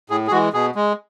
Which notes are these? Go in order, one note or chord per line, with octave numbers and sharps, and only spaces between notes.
A2 G#4
G#4
E3 G#3 F#4
B2 G#4
G#3